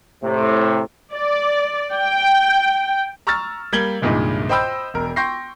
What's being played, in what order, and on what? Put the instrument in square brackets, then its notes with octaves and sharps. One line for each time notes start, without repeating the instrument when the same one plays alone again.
[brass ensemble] A2 C3
[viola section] D5
G5
[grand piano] A#5 C#6 E6 F6 A6
G3 A#3 G#6 F#7 G7
C2 G2 A#2 D#3 G#3
C5 D#5 G5 B5 E6 G6
E1 A#4
G5 C6 C#6 G6 A#6 C7